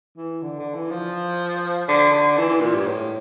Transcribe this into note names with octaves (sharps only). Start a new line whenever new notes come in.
E3
D3
D3
E3
F3
D3
D3
E3
E3
A#2
G2
A2